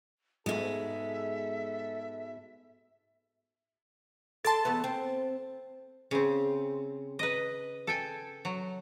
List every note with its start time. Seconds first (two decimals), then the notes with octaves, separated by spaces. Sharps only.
0.46 G#2 B2 G#3 A4 E5
4.45 A4 D5 A5 C6 A6
4.65 E2 A3 B3
4.84 C4
6.11 C#3 C4
7.19 B4 D#5
7.87 A4 G5 G#5
8.45 F#3